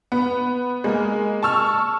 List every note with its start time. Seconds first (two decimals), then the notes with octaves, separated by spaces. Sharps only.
0.12 B3
0.84 G#3 A#3
1.43 A5 C#6 E6 F6